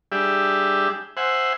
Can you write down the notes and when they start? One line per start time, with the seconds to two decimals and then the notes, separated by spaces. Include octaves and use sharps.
0.12 G3 D4 G4 G#4 E5
1.17 C5 E5 F#5 G#5